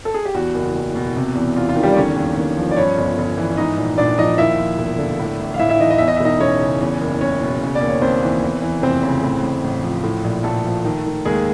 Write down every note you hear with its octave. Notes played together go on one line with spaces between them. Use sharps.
A4
G#4
G4
E2 F#4
F#1
F#1
B2
C3
E2
E2 F4
F4
D#3
G3 G4
D5
D3 C#4 C#5
D#2
D#2
F3
D5
G2 C#4 C#5
G1
G1
E3
G#2 D#4 D#5
A#1
A#1 D4 D5
F3 D#4 D#5
D#2 E4 E5
F3
E1
D3
A2
A1
F5
A1 E4 E5
E4 E5
E3 D#4 D#5
D#5
E2 E5
D#5
E5
E1 D#4 D#5
E1 C#4 C#5
C#3
E2
F#1
F#1 C#4 C#5
B2
C#3
D5
D#2
C#5
D#2 C4 C5
E3
E2
E3
F1 C4 C5
C#3
A2
A1
A1
F3
A2
A#1
A#1 A3 A4
F3
D#3
D#3
D#2 G#3 G#4